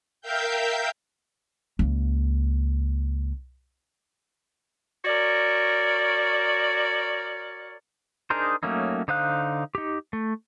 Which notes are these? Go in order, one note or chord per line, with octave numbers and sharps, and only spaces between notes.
A#4 E5 F5 G5 G6
C#2 A#3
F#4 A#4 C#5 D5
D4 D#4 G#4 A#4 C5
F#3 A3 A#3 C#4 D#4
D3 D#4 C5 F5 F#6
D#4 G4
A3